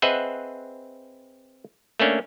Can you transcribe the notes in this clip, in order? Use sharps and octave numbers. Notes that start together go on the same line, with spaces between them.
C4 G#4 B4 D#5 E5 F#5
A3 A#3 C#4 D4